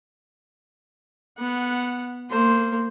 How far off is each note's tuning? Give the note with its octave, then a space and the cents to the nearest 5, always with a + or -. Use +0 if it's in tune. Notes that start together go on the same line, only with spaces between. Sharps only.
B3 +0 F#5 -15
A#3 -30 C5 +0